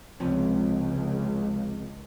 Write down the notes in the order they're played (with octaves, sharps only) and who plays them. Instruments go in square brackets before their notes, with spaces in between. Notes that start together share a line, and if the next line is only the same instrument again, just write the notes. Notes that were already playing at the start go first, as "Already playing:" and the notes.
[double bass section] C#2 [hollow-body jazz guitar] C3 F3 C#4